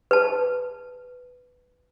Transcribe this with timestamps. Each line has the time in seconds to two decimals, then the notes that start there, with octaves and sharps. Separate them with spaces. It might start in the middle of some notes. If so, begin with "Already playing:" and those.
0.11 B4 A5